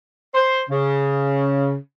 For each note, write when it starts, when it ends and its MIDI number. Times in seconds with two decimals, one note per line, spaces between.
0.34 0.61 72
0.70 1.75 49